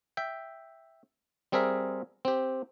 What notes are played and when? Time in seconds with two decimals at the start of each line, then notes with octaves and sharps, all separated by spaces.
0.17 E5 G5
1.52 G3 C4 G#4 A#4 E5
2.25 C4 G4